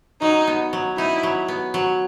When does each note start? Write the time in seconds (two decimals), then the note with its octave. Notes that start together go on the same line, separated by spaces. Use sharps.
0.21 F#3 D#4
0.47 B3
0.73 F#3
0.97 D#4 E4
1.23 F#3
1.48 B3
1.74 F#3